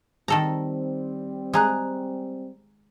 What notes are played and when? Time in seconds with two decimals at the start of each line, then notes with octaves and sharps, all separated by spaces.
0.28 D#3 G3 C4 A4 A#5
1.54 G#3 G#4 G#5 A#5 F#6